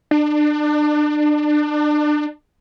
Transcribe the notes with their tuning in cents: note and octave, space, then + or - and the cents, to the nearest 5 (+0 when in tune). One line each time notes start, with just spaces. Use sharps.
D4 +30